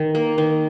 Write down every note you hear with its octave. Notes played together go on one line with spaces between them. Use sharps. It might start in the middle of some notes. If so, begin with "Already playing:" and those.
Already playing: D#3
A#3
D#3